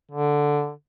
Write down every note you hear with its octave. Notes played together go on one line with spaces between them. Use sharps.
D3